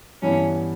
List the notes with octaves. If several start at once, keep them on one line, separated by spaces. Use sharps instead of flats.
G2 E3 B3 C#4 E4